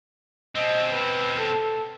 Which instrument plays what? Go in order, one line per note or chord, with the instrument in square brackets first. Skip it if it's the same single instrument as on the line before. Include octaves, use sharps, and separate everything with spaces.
[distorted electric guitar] B2 C4 [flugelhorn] D#5
[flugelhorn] B4
A4